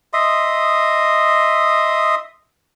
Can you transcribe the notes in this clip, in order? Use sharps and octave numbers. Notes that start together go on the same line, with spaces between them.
D#5 E5 C6 D#6